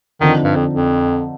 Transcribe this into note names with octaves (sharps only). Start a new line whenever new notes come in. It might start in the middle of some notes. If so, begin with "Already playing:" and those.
D3 D#3 F3 C4 D#4
G2
F2
F2